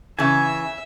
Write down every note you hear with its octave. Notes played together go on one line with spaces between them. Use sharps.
C#3 E3 E5 G#5